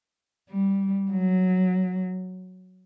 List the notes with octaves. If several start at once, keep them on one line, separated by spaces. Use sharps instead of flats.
G3
F#3